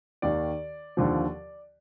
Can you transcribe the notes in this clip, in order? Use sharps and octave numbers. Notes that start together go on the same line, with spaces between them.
D#2 D#3 D5
D#2 D3 F3